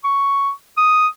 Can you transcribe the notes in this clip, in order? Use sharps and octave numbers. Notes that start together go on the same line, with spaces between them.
C#6
D#6